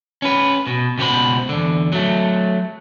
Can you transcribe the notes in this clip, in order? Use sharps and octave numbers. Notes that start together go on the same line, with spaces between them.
C#4 B4
B2
C#2 B2 B3 G4 C5 B5
E2 D3
F#3 A3